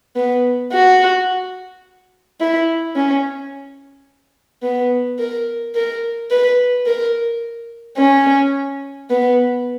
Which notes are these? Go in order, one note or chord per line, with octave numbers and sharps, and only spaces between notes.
B3
F#4
E4
C#4
B3
A#4
A#4
B4
A#4
C#4
B3